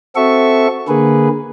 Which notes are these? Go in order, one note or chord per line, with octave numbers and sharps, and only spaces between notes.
C4 F#4 A4 E5 C#6
D3 A#3 G#4 B4